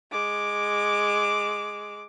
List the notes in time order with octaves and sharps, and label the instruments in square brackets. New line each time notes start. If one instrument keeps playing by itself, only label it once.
[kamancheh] G#3 D6